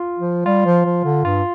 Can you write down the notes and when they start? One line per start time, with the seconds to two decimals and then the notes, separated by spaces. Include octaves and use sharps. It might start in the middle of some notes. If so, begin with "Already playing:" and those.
Already playing: F4
0.19 F3
0.46 G3 F4
0.65 F3
0.85 F3
1.04 D3
1.25 G2 F4